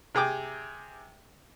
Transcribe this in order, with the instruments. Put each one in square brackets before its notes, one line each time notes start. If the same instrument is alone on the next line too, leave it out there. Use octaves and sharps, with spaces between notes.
[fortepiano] C3 G#4 G5 D6